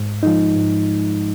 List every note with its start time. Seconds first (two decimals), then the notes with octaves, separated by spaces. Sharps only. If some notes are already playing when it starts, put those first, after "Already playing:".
Already playing: G#2
0.23 F3 G#3 D#4
0.56 G#2